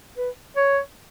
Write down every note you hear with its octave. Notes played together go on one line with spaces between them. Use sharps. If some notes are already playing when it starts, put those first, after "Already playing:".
B4
C#5